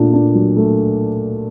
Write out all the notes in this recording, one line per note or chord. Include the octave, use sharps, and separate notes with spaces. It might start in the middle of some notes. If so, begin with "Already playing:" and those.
Already playing: A#2 A3 D4
D4
F#3
A3